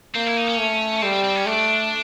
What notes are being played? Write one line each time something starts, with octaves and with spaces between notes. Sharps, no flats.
A#3 C4
E4
D#4
C#4
A3
G3 C4
C4
C4
C#4
A3 D4